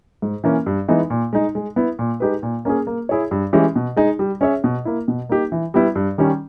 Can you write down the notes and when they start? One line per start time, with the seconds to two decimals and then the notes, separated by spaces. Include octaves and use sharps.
0.22 G#2
0.44 E3 A#3 C#4
0.66 G2
0.88 E3 G#3 B3 D#4
1.10 A#2
1.33 G#3 D#4
1.55 G#3
1.76 B3 E4
1.99 A#2
2.20 G#3 D#4 G4 B4
2.43 A#2
2.65 A#3 C#4 G#4
2.87 A#3
3.09 E4 G#4 C#5
3.31 G2
3.53 E3 G#3 C#4 G4
3.76 B2
3.97 G#3 D#4 G#4
4.19 G3
4.41 C#4 G#4 C#5 E5
4.64 B2
4.85 A#3 E4
5.08 B2
5.29 A#3 D#4 G4
5.52 E3
5.74 G3 B3 E4
5.95 G2
6.18 D#3 G3 C#4